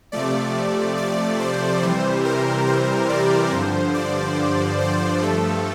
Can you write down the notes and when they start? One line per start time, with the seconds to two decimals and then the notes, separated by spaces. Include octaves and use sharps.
0.12 C3 F3 A3 D5
0.97 D5
1.40 C5
1.82 C3 E3 G3 C5
2.25 A#4
2.67 C5
3.09 D5
3.52 G2 D3 F3 C5
3.94 D5
4.80 C5
5.22 G2 F3 A3 A4